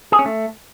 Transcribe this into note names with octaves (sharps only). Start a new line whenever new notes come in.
G#4
C#4
A3